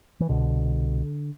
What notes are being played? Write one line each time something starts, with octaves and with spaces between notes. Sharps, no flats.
E3
C2 B2 D3